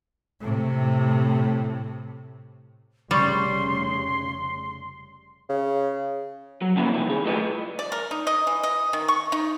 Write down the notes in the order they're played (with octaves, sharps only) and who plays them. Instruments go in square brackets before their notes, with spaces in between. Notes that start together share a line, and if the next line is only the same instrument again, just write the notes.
[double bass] A2 C3
[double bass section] F1 C#3 [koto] G3 [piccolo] C6 [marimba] C#6 A6
[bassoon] C#3
[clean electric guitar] F#3
C#3 G3 A#3 B3 C#4 E4
C3 D#3 F3 G3
D#3 G#4
D2 A2 G3 F4 B4 D#5
[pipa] D5
A#4
D#4
D#5
E3
D#5
D#3
C#6
D#4